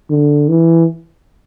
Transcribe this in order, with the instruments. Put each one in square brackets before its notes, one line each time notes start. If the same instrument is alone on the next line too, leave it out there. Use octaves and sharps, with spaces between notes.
[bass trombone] D3
E3